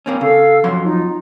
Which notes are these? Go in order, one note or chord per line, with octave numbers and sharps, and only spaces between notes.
A#3 C4 C#4
C#3 A4 F5 E6
F2 F#3 C6
D#4 F4